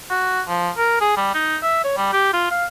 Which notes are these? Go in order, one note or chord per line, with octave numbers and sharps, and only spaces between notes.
F#4
F3
A#4
G#4
G3
D#4
E5
C#5
G3
G4
F4
F5